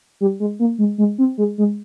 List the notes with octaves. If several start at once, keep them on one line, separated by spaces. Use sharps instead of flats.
G3
G#3
A#3
G#3
G#3
C4
G#3
G#3